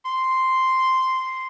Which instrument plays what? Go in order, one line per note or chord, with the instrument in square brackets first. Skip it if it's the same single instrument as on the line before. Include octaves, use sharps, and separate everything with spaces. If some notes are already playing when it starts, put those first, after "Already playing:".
[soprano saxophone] C6